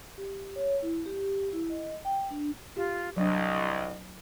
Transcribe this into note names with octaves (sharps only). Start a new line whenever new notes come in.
G4
C#5
E4
G4
E4
D#5
G5
D4
F4 G4
C2 F#3 D4 D#5